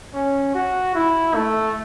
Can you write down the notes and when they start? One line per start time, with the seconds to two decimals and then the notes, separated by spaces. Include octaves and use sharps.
0.14 C#4
0.54 F#4
0.95 E4
1.35 A3